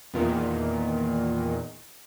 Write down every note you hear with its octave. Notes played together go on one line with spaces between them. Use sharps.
E2 A#2 D#3